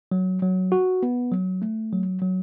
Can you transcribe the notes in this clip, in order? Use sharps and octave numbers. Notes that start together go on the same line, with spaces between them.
F#3
F#3
F#4
B3
F#3
A3
F#3
F#3